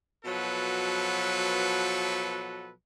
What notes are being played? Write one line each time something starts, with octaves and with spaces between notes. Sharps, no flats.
B2 F3 F#3 A4 B4